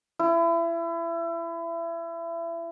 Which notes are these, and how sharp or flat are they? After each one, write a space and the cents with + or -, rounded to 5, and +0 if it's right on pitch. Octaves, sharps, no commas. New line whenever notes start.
E4 +30